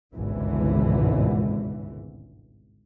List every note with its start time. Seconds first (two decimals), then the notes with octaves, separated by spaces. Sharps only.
0.15 G#1 C#2 G2 B2 D3 E3